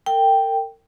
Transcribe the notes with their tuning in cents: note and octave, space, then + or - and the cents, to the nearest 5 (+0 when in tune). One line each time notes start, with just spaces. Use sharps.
A#4 -40 G5 +0